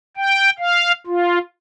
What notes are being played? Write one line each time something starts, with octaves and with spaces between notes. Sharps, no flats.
G5
F5
F4